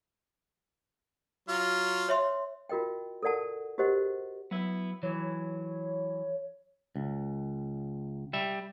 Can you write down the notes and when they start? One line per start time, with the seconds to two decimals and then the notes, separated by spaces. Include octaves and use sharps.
1.48 F#3 F4
2.09 C#5 E5 C6
2.69 F4 F#4 A#4 D#5 G5
3.23 A4 A#4 D5 F#5 A5
3.78 F#4 G4 A#4 C5 D#5 F#5
4.51 F#3 B3 E4
5.03 E3 F#3 C#5
6.96 C#2
8.33 G3 E5